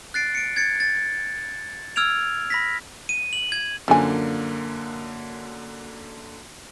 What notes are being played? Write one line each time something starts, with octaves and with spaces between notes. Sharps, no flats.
F#6 A6 C7 D7
C#7 D7
G#6 A6 C#7
A6
E6 F6 G#6 D7 F7
B5 A#6 B6
D#7
F#7
G#6
F#2 D3 F3 A#3 G#5